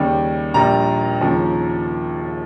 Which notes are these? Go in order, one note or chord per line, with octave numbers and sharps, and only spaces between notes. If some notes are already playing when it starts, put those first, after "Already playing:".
Already playing: D#2 C#3 G3 G5
A#1 A#2 G3 A#5
D#2 C#3 F3